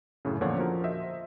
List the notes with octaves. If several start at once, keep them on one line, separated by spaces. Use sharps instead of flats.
F#2 A2 C#3
E2 A#2 D3 F3 C#5 F#5
F3 F#4 A#4
C5 D#5 E5